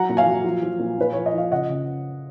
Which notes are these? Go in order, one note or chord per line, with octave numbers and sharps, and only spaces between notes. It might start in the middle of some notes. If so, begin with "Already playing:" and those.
Already playing: F#3 F#5 A#5
A#2
F5 G#5
F#3
F3
F3
A#2
A#2 B4
F3 C#5
D#5
F3 F5
C#3 D#5 F#5
C#3